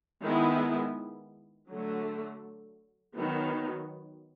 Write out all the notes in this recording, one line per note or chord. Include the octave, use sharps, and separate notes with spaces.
D#3 G#3 B3 E4
D3 F#3 A3
D#3 F#3 B3